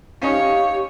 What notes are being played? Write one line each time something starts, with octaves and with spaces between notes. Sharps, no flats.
C#4 D#4 G4 C#5 F5